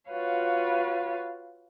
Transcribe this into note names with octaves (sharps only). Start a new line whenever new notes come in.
F4 F#4 B4 C#5 F5